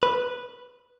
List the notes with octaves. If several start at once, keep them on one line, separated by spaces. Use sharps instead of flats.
B4